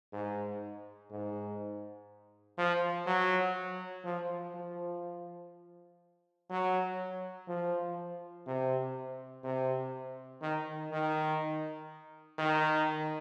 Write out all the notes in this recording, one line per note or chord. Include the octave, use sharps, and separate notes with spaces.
G#2
G#2
F3
F#3
F3
F3
F#3
F3
C3
C3
D#3
D#3
D#3